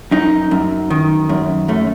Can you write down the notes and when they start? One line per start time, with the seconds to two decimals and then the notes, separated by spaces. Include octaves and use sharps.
0.11 F#2 D#4
0.51 F#2
0.90 D#3
1.29 F#2
1.68 F#2 A3